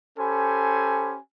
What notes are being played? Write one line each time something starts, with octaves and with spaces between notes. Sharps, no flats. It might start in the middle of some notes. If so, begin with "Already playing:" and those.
C#4 G4 A4 C5 G#5 B5